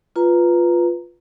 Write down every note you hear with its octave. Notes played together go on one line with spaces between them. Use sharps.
F4 B4 A#5